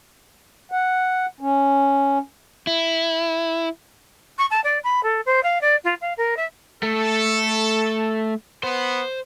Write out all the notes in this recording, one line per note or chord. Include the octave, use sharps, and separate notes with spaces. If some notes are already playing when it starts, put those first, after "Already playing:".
F#5
C#4
E4
C#6
A5
D5
B5
A4
C5
F5
D5
F4
F5
A#4
E5
A3 A4
B3 C5